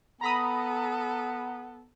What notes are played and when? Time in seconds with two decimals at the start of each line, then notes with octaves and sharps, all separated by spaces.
0.21 B3 A4 A#5 B5 D#6